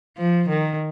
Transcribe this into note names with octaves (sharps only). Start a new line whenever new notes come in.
F3
D#3